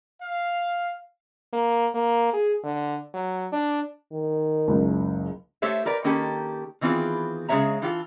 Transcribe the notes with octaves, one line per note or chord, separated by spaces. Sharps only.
F5
A#3
A#3
G#4
D3
F#3
D4
D#3
F#1 C#2
A3 G4 A4 C5 C#5 E5
G4 A#4 B4 D5
D#3 A#3 C#4 G4 A4
D#3 E3 B3 C4 F4 G#4
C#3 G#3 G#4 C#5 E5 A#5
E3 F4 G4 A4